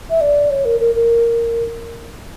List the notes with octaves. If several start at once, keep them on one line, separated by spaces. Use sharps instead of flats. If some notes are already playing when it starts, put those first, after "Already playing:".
E5
D5
C#5
A#4
A#4
A#4